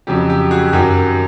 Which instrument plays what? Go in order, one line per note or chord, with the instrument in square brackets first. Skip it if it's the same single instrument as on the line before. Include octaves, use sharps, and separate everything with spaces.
[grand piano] F2 C#3 F#3 G4
G4
F#4 G#4
F#2 D#3 F#3 G4